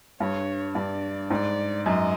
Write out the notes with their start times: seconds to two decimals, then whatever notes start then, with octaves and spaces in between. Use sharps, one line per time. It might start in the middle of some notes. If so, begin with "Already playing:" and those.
0.20 G2 C#5
0.75 G2 D5
1.30 G#2 D5
1.86 F#2 D#5